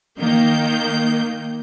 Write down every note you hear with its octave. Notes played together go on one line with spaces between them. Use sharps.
D#3 A#3 G6